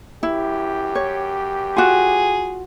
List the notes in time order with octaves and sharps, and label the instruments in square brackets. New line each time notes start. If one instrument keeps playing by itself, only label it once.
[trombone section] F#2 G4 [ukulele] E4
[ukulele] C#5
[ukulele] F4 F#4 [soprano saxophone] G#4